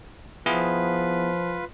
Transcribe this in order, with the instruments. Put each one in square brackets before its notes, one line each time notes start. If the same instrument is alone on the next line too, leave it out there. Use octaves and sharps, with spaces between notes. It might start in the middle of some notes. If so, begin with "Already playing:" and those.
[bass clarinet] F3 [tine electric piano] B3 E4 G#4 [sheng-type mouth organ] F4 B4